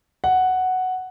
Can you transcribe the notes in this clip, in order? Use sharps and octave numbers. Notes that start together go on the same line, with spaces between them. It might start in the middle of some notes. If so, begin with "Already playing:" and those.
F#5